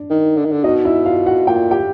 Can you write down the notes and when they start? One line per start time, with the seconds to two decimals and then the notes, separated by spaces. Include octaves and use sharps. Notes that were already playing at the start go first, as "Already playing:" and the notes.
Already playing: D4
0.10 D#3
0.38 D3
0.45 D#3
0.52 D3
0.64 B2 D#4 D#5
0.85 E4 E5
1.05 F4 F5
1.26 F#4 F#5
1.47 A#2 G5
1.71 G4 G5